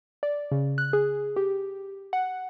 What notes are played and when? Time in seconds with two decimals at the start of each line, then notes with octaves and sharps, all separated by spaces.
0.23 D5
0.52 C#3
0.78 F#6
0.93 G#4
1.36 G4
2.13 F#5